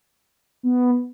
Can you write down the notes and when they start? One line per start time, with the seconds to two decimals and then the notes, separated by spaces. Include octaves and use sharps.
0.63 B3